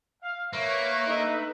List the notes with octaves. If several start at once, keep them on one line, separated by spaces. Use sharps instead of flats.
F5
A#3 B4 C#5 E5 C#6
D3 D#4